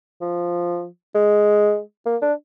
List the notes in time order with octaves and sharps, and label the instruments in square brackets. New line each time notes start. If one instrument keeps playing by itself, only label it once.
[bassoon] F3
G#3
A#3
D4